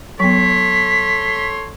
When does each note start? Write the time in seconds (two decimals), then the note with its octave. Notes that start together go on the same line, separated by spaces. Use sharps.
0.20 F#3 B3 A4 C#5 C6 B6